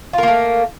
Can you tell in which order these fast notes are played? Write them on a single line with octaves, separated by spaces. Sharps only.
F4 A#4 A#3 A3